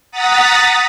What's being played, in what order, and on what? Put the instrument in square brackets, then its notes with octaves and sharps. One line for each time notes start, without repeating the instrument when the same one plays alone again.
[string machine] F#5 A#5 D#6 A6 B6